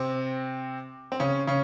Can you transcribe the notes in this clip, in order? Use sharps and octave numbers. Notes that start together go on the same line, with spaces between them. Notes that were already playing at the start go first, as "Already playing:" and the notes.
Already playing: C3 C4
C4
C#3 C#4
C#3 C#4